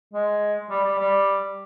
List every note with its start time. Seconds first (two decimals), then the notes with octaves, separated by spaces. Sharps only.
0.14 G#3
0.70 G3
0.84 G3
0.99 G3